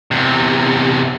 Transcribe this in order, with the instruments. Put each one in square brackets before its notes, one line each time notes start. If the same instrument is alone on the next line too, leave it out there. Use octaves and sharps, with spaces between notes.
[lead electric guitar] E2 C3